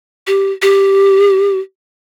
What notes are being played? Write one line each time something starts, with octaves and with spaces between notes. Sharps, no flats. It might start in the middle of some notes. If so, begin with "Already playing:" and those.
G4
G4